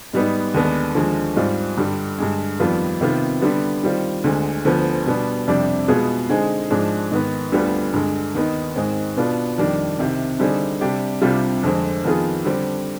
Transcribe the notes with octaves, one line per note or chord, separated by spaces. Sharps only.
G#2 G3 B3 D#4
D#2 D3 G#3 B3 D4
D#2 D3 F3 G#3
G#2 G3 C4 F4
G2 D3 G3
G2 D3 G#3
F2 D#3 G3 B3 F4
C3 D#3 B3 F4
D3 G3 B3
D#3 G3 C4 F4
D2 D3 G#3
D2 D3 F3 B3
B2 G3 B3 D4
F2 C3 G3 D4
B2 G#3 B3 F4 G#4
D3 G#3 C4 D#4 G#4
G#2 F3 G#3 D4
G#2 D#3 B3
D2 D3 G3 B3 F4
G2 D3 G#3
D#2 D#3 B3 D#4
G#2 D#3 G#3 C4
B2 B3 D4 F4
F2 D#3 G3 D4
C2 C3 D#3
D3 G3 C4 D#4 G#4
C3 G3 D4 G4
C2 C3 G3 D4 F4
F2 D3 G#3 C4
F2 D#3 B3 F4 G#4
D3 G3 C4